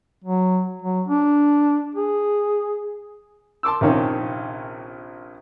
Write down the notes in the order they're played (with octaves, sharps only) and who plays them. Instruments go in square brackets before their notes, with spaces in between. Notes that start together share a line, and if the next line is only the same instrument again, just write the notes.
[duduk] F#3
F#3
D4
G#4
[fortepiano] A5 C6 D6 E6
A#1 C3 D#3 C#4